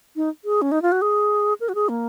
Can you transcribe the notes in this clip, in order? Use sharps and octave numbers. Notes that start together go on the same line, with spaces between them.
D#4
G#4
C#4
D#4
F4
F#4
G#4
A#4
F#4
G#4
A#3